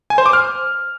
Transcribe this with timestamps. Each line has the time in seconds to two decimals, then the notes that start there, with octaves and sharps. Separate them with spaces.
0.10 G#5
0.18 C5
0.26 D6
0.33 F6